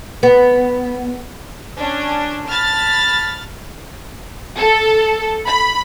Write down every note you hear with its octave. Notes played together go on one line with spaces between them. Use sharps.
B3
C#4 D4
A5 B5 F6 A6
A4
B5